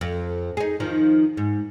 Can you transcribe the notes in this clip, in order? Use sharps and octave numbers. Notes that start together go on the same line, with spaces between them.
F2
D#4 G#4
D#3 F3 D#4
G#2